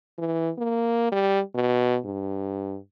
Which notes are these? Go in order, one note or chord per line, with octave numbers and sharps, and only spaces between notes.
E3
A#3
G3
B2
G2